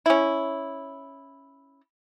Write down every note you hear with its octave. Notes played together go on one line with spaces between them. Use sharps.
C#4 E4